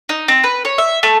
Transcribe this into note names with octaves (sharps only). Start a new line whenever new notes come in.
D#4
C4
B4
C#5
E5
A3